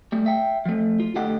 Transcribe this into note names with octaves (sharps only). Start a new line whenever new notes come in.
G3 A3
E5 G5
F3 A3
F4
D3 A3 G4 D#5 F#5